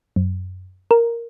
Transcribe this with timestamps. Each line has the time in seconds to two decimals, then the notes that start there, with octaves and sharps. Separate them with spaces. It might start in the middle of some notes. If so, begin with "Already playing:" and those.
0.16 F#2
0.91 A#4